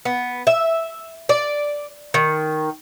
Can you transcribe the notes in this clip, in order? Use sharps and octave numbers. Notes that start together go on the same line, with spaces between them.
B3
E5
D5
D#3